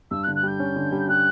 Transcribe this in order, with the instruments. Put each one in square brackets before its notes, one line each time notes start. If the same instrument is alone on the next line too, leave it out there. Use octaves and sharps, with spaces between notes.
[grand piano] G2 [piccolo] E6
[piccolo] F#6
[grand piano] D3
[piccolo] F#6
[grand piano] G3 [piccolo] G6
[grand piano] C#4
D3
G3
[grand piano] G3 [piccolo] F#6